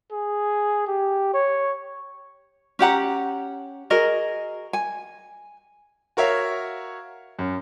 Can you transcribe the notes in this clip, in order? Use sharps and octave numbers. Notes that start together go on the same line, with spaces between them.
G#4
G4
C#5
C#4 G4 F#5 A#5
F#4 G#4 A#4 D#5
G#5
F#4 A#4 C#5 E5 F5
F#2